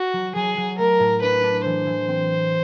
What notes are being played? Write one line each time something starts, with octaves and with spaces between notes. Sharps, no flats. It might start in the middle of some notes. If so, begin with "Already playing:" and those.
Already playing: F#4
F#3
F#3 G#4
F#3
A3 A#4
A2
D4 B4
D4
E3 C5
E3
C4